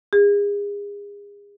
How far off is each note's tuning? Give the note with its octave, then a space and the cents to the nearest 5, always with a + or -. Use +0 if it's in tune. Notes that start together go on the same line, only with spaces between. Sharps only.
G#4 -35